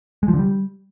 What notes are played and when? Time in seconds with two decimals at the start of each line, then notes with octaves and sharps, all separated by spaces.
0.23 G#3
0.28 F3
0.34 D3
0.39 G3